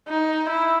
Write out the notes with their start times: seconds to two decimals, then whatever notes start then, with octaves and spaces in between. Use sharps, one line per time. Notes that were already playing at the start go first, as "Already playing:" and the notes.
0.08 D#4
0.49 E4